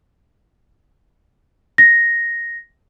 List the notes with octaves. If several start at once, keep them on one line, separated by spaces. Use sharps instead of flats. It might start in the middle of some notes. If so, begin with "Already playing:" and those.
A#6